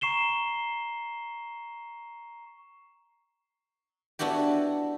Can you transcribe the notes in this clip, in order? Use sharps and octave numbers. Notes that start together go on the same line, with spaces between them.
A#5 C#6 C7 E7 G7
B3 D4 E4 F#4 G4